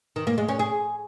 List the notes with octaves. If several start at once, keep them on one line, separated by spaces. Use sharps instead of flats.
D#3
A#3
G#3
C#4
G#4